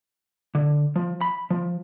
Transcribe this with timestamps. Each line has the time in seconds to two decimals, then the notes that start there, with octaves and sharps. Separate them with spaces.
0.55 D3
0.96 F3
1.21 B5
1.51 F3